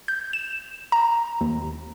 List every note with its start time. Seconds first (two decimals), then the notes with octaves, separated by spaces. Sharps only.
0.08 G6
0.33 E7
0.92 A#5
1.41 D#2